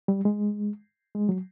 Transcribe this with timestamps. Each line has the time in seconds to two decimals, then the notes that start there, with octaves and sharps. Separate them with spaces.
0.08 G3
0.25 G#3
1.15 G#3
1.29 F#3